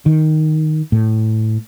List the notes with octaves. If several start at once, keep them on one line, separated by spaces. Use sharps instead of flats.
D#3
A2